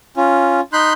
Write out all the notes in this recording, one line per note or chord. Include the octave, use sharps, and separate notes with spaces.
C#4 F4
D#4 B5 C6 F#6 G6